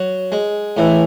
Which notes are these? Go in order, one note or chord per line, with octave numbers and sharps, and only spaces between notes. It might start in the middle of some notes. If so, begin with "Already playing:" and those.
Already playing: F#3
G#3
A2 E3